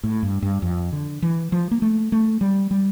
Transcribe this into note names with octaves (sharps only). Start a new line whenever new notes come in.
A2
G2
G2
F2
D3
E3
F3
A#3
A3
A3
G3
G3